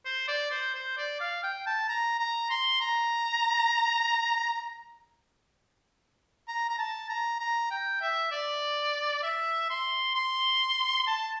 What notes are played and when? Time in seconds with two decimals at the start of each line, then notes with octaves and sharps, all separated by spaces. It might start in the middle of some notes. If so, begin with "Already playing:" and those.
0.05 C5
0.28 D5
0.51 C5
0.75 C5
0.97 D5
1.20 F5
1.43 G5
1.66 A5
1.89 A#5
2.19 A#5
2.50 C6
2.81 A#5
6.48 A#5
6.69 A#5
6.78 A5
7.09 A#5
7.40 A#5
7.71 G5
8.02 E5
8.32 D5
9.23 E5
9.70 C6
10.15 C6
11.07 A5